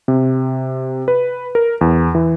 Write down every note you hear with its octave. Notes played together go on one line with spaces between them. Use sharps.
C3
B4
A#4
E2
E3